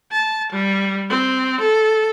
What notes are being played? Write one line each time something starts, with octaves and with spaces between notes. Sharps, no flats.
A5
G3
C4
A4